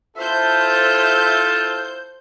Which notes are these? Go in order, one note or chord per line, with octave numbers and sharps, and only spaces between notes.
E4 F4 A4 C5 E5 G6